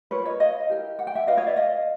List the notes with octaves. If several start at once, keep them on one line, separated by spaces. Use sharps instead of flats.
F4 A#4 B4 C#5
C#5 D#5
D#5 F5
E4 G4 A#4
F#5
G5
E5 F#5
F4 G#4 B4 D#5 F5
C#5 D#5
D5 E5
D#5 F5